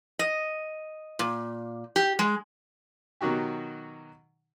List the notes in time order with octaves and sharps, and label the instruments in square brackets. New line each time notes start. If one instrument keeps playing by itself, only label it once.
[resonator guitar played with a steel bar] D#5
A#2
G4
G#3
[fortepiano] B2 D#3 F#3 D#4 F#4 G4